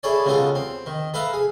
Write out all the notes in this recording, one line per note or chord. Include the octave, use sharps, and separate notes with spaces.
E4 G#4 A4 C#5 D5
C#3 G3 G#3 B3 F4 A4
C4
D#3
A4 B4 E5 F5 A#5
G#4